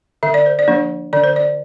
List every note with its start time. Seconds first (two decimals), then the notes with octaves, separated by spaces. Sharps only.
0.23 D3 E5
0.34 D5
0.46 C5
0.59 D5
0.68 F3 A#3 D4
1.13 D3 D5
1.24 C5
1.36 D5